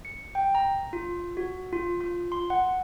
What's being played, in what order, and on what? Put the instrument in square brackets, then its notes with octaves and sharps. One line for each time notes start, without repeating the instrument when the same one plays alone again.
[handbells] C#7
G5
A#5
F4
F#4
F4
F4
C6
F#5